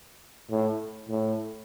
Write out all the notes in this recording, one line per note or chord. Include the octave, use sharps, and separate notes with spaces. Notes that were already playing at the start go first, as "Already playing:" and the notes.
A2
A2